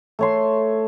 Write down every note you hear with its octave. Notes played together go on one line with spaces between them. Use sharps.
A3 C#5 C6